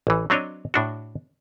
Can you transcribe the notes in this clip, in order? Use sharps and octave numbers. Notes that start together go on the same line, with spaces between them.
A1 E3
F#3 C4 D4 C#5 D#5
A2 D4 F#4